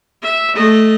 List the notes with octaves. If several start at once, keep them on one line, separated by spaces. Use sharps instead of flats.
E5
A3 D#5